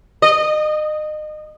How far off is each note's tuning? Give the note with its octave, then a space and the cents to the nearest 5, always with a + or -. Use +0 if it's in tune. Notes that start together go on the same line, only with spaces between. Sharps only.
D#5 -30